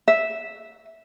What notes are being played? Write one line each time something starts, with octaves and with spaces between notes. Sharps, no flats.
E5